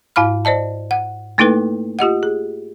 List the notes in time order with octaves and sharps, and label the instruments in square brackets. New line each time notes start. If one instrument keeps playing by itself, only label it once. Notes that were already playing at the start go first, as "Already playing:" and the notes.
[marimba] G#2 E4 F5 B5 F6
C5 D5 D#5 A5
F#5
A3 A#3 D#4 E4 A4 B4
F4 G4 D#5 F#5
G#4